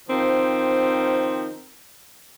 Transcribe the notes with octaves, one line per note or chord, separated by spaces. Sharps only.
D#3 F3 C4